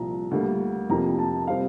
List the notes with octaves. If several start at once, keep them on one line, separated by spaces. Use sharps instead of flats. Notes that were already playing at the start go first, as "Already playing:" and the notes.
Already playing: C2 A#2 F3 A#5
D2 D3 G3 A#3
F2 C3 F3 A#3 A#5
A5
C3 G3 C4 F5